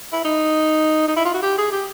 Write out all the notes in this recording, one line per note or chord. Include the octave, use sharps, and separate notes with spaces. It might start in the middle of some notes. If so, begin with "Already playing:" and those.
E4
D#4
D#4
E4
F4
F#4
G4
G#4
G4